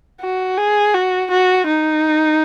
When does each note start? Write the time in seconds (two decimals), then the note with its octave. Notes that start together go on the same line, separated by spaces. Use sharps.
0.21 F#4
0.58 G#4
0.94 F#4
1.31 F#4
1.67 D#4